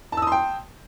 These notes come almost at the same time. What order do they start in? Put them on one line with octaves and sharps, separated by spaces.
A5 E6 D#6 C6 G5